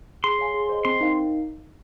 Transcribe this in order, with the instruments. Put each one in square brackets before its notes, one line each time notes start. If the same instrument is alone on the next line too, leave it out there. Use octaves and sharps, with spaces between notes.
[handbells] G#4 [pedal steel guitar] C6
[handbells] C#5 F5 G#5
G#4
C5 D#5
[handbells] C4 [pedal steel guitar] C6
[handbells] D#4 A#4 F5